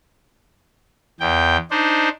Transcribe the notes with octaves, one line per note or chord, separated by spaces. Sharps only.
E2 G5
D4 D#4 C5